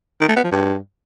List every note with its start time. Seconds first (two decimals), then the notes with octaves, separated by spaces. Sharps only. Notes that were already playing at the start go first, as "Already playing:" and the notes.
0.21 D#3
0.28 A3
0.36 B3
0.44 F3
0.52 G2